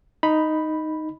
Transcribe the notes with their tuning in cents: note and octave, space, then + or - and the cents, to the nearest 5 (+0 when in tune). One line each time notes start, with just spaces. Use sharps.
D#4 +0 B5 +0